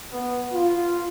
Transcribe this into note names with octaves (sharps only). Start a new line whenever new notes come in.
B3
F4